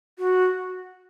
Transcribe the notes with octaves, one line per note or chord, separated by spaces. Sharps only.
F#4